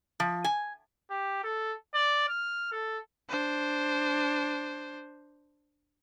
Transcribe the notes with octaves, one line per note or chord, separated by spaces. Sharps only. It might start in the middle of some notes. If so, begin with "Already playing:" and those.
F3
G#5
G4
A4
D5
F6
A4
D4 C5